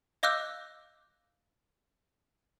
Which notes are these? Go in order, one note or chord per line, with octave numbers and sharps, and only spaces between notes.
D#5 F5 D6 E6 F#6 G6